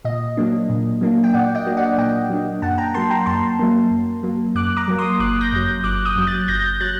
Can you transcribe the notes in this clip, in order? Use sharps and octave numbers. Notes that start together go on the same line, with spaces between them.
A#2 D#5
F#3 A#3 D4
A#2
F#3 A#3 D4
G5
A#2 D5 F#5
D#5 G5
F#3 A#3 D4
D5 F#5
A#2 D#5 G5
F#3 A#3 D4
F#2 F#5 A5
G5 A#5
F#3 A#3 A5 C6
G5 A#5
F#2 A5 C6
F#3 A#3
F#2
F#3 A#3
F#2 D6 F#6
A#5 D6
F#3 A#3
C6 D#6
G1 D6 F#6
G6 A#6
F#2 F#3
G1 D6 F#6
D#6 G6
F#2 F#3
F#6 A6
G1 G6 A#6
F#3 F#6 A6